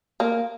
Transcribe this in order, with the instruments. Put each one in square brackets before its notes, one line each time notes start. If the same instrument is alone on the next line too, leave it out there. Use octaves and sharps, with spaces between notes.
[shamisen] A#3